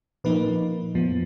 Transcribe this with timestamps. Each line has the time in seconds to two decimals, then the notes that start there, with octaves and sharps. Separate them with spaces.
0.24 A#2 F3 A#3 D#4 B4
0.94 F2 F3 B3